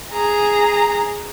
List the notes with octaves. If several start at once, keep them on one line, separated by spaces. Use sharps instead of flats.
G#4 A#5